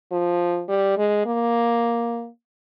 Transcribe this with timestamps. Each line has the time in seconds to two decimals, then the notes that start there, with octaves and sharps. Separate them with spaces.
0.12 F3
0.68 G3
0.97 G#3
1.26 A#3